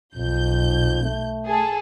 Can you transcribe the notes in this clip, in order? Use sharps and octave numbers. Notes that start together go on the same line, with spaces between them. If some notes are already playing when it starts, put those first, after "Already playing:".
B1 F2 G6
A3
G#4 A4